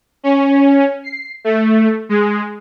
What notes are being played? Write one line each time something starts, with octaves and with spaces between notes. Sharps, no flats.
C#4
C7
A3
G#3